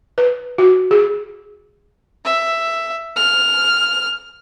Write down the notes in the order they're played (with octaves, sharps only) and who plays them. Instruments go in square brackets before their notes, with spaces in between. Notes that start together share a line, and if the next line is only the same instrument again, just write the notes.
[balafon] B4
F#4
G#4
[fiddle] E5
F6